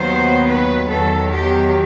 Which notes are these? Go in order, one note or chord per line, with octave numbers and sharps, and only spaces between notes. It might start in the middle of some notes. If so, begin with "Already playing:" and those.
Already playing: D#2 D#3 F#3 B3 C5
B4
E2 D#3 F#3 A4
G4